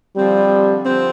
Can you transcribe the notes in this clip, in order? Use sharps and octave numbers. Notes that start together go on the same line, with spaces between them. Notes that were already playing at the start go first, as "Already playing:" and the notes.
D3 F3 G3 C4
D3 F3 C4